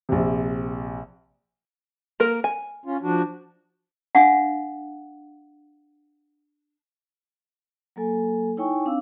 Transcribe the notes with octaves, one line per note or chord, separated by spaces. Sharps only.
A#1 C3
A#3 A#4
G#5
C#4 F4
F3 D4 F#4
D4 F5 F#5
F#3 A#3 A4 G#5
D#4 E4 C#5 G5 G#5 C#6
C4 D4 F5 E6